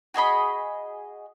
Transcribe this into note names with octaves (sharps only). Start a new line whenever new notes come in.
F#4 G#4 D#5 B5